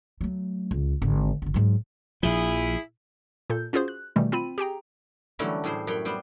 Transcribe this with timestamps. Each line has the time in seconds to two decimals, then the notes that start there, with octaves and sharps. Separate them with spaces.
0.21 F#3 A3
0.71 C#2
1.02 G#1 D3
1.42 G1 D3
1.54 G#2 F#3
2.23 A#1 F3 E4 G#4
3.50 A#2 A4 G6
3.73 C#4 F4 F#4 G#4 C5
3.88 F#6
4.16 B2 D#3 E3 G3 A3
4.32 C4 F4 B5 D#7
4.58 G4 G#4 G5 A#5
5.39 D3 E3 F#3 G3 A3 C#4
5.64 A2 G3 E4 G#4 C5
5.87 F#2 C#5 G5 B5 C6
6.05 G3 B3 C5 G5